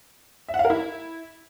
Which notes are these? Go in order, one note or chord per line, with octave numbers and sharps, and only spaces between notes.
E5
F#5
F5
A#4
E4